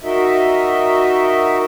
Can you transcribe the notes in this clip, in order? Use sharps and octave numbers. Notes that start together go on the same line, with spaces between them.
D#4 F#4 A#4 D#5 E5